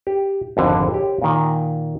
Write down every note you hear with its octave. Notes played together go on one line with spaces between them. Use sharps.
G4
G#1 F2 D3
G4 C#5
A#2 D#3